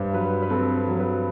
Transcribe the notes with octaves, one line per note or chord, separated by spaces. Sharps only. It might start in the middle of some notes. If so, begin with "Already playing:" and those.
Already playing: G2 C5
F#3 B4
B4
C4 A4
F#3
B4